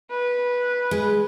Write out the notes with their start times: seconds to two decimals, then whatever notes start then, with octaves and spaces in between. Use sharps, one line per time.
0.11 B4
0.91 G#3